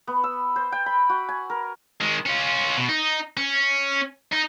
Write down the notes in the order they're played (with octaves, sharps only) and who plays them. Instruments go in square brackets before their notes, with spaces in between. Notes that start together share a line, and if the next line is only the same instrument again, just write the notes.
[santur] B3
E6
C5
G5
B5
F#4
G#5
A#4
[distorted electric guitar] D#3 G#3
C#4 F4
B2
D#4
C#4
D#4